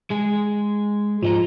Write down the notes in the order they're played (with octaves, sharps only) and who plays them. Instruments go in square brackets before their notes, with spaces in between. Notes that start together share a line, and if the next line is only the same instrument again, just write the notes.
[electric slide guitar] G#3 G#4
[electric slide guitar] G#2 D#5 A#5 [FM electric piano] F3